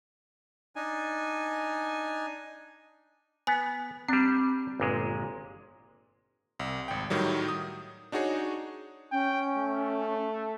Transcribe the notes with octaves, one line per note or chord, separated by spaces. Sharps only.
D4 D#4 G#5
B3 G#5
G3 C4 D4
G1 A#2 G#3
C2
G#1 G5
A2 D#3 F#3 G3
D#6
D4 D#4 F#4 G#4 C#5
C#4 G5
A3